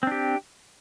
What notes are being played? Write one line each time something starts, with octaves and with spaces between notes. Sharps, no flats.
C4 D4 G4